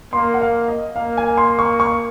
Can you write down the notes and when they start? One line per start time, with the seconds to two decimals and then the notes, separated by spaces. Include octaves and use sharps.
0.13 A#3 C6
0.34 F#5
0.41 F5
0.68 D#5
0.96 A#3 F5
1.17 G#5
1.37 C6
1.59 C#6
1.80 C#6